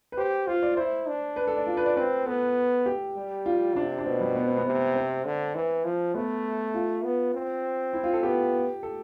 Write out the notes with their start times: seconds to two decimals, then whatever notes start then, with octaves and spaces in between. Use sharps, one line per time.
0.12 B4
0.18 G4 C5
0.47 F4 C5
0.63 D5
0.77 E4 C5
1.07 D4
1.36 B4
1.47 A4
1.57 D5
1.67 F4
1.77 B4
1.86 D5
1.97 C4 B4
2.26 B3 A4
2.86 G4
3.16 G3
3.46 F4
3.75 C3 D4
3.98 D4
4.05 B2 C4
4.20 G3
4.36 B3
4.46 C4
4.57 B3
4.66 C3
4.95 C4
5.25 D3
5.55 E3
5.85 F3
6.15 A3 B3
6.74 F4
7.05 B3
7.35 C4
7.93 E4
8.04 F4
8.13 A4
8.23 B3 G4
8.83 A4